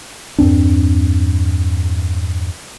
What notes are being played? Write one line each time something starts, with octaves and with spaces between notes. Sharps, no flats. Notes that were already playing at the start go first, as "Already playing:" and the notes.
E2 G2 C4 D4